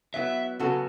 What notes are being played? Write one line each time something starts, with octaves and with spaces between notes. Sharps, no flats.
F#3 B3 E4 E5
C#3 F#3 B3 F#4 A4